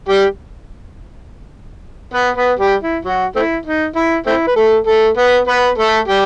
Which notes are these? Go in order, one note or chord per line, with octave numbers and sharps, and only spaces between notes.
G3 G4
B3 B4
B3 B4
G3 G4
E4
F#3 F#4
A3 C4 E4
D#4
E4
A3 C4 E4
B4
A3 A4
A3 A4
B3 B4
B3 B4
A3 A4
G3 G4